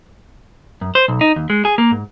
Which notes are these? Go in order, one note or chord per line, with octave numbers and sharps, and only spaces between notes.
F#2
C5
B1
D#4
D#2
G#3
G#4
A#3
G#2